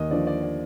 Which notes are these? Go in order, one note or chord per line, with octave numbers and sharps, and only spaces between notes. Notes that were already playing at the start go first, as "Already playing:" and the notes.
Already playing: D#2 D#5
D3 F3 D5
D5
D5